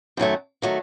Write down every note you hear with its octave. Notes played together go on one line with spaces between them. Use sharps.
F#2 D#3 F#3 A3
D#3 F#3 A3